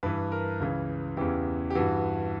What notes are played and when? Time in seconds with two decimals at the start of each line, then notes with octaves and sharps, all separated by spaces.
0.03 G2 E3 B4
0.32 A#4
0.60 C#2 C#3 E3
1.17 E2 C#3 E3 G4
1.70 G4
1.75 G2 E3 F#4